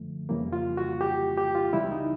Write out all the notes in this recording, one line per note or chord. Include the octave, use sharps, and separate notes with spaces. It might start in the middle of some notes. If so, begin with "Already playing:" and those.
Already playing: F#2 D3 F3 A3
F2 C#3 E3 G3 A#3
F4
F#4
G4
G4
F4
C#2 C#3 E3 G3 E4
D#4